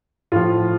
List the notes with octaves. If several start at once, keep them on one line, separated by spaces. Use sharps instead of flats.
A2 F3 F4